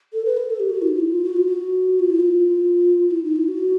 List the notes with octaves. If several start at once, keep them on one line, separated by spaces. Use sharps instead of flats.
A4
B4
A#4
A4
G4
F#4
E4
D#4
F4
E4
F4
F#4
F4
F#4
F4
E4
F4
E4
D#4
E4
F#4